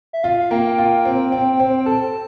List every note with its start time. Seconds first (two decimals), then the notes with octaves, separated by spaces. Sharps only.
0.13 E5
0.23 F4 F5
0.39 F5
0.51 A#3 G5
0.78 F4
1.05 C4
1.32 C4
1.60 C4
1.86 A4 A5